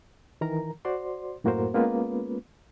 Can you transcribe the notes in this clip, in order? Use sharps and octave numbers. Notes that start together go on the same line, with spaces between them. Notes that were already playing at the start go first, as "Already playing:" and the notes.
D#3 E3 A#4 A#5
F#4 C5 D5 C6
F#2 A2 A#3 F#4 A#4 C5
G#3 A#3 B3 C#4 F4 B4